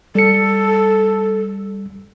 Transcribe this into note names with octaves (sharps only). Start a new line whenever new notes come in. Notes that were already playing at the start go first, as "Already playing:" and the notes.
G3 A4 C#7